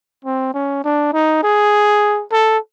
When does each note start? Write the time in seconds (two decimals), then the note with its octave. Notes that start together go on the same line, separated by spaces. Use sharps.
0.25 C4
0.54 C#4
0.84 D4
1.13 D#4
1.43 G#4
2.32 A4